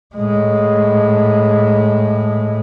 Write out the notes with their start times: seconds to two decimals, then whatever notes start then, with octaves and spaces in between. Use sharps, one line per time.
0.15 A2 G#3